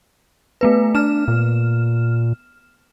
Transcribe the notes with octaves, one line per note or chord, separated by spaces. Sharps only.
A3 B3 B4
D4 F6 E7
A#2